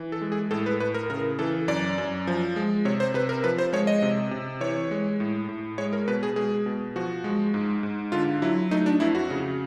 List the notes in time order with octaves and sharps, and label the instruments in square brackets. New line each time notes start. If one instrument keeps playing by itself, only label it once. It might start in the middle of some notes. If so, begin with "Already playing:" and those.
Already playing: [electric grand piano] E3
A4
G#3
G#4
A2 A4
B4
A2 B4
A#4
C#3 A#4
E3 A4
F#2 D5
F#2
F3
G#3
C3 C#5
C5
C3 B4
A#4
F3 B4
C5
G#3 C#5
D#5
C3
C3
E3 C#5
G#3
A2
A2
G#3 C#5
A#4
B2 B4
G#4
G#3 G#4
B2
F3 F#4
G#3
G#2
G#2
D3 F4
F#3 E4
A3 D#4
D4
F2 E4
F#4
C#3